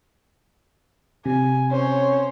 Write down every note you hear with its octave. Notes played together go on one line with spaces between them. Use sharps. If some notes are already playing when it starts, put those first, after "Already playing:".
C3 G#5
C#4 C5 C#5